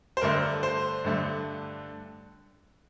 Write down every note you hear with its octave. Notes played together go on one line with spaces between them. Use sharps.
C5
G2 D3 A3 A#4
C5
G2 D3 A3